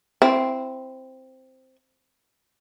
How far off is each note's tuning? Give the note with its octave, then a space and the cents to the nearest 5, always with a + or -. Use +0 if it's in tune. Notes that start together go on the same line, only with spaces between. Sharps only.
C4 +0 E4 +20